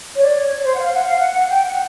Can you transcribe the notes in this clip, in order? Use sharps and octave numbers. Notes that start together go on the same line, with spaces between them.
C#5
D5
C#5
C#5
C5
F#5
F5
F#5
F5
F#5
G5
F#5